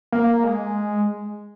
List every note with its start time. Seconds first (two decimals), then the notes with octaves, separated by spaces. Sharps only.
0.12 A#3
0.44 G#3